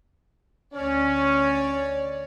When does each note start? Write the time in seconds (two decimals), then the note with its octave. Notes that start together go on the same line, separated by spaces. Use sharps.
0.74 D2 C#4 C#5 D5